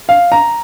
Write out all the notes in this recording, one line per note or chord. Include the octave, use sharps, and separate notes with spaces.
F5
A#5